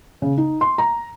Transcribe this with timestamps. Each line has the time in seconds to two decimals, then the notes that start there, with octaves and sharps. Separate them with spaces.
0.22 C#3
0.38 D#4
0.61 C6
0.78 A#5